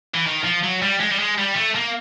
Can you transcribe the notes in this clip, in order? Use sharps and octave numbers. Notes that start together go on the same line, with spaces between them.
E3
D#3
F3
F#3
G3
G#3
G3
G#3
G3
A3
A#3